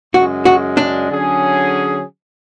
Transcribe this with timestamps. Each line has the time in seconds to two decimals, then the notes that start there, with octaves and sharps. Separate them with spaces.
0.14 F#2 C#3 G#3 F#4
0.45 F#4
0.77 D4
1.09 D3 F#3 C#4 G#4